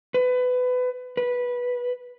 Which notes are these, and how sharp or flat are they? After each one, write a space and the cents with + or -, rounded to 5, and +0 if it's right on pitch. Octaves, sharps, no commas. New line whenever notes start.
B4 +25
B4 -10